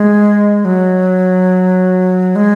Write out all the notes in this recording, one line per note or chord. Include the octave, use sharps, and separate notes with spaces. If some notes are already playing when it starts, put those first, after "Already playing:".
Already playing: G#3
F#3
G#3